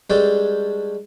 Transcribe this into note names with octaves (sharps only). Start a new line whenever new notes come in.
G2 G#3 C#4 D4 A4 G5